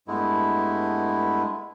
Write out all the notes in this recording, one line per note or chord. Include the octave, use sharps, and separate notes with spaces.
G2 G#3 A3 B3 E4